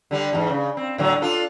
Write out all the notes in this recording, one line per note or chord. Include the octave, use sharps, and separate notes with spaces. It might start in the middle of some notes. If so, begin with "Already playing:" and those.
D3 G3
E2 G#2
C#3
C4
A2 D3 F#3
D4 F4 A4